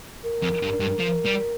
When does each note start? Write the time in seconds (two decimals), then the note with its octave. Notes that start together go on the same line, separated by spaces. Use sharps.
0.24 A#4
0.42 F2
0.62 G2
0.80 G2
0.99 F3
1.26 G3